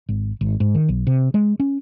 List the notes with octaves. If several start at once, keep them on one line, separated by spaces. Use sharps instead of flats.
G#1
G#1
G#2
D#3
B1
C3
G#3
C#4